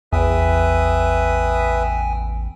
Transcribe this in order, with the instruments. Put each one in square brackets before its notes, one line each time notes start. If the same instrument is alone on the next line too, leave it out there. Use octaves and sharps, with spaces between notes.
[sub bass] A1 [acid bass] E2 [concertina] B4 E5 D#6 [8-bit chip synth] G5 G#5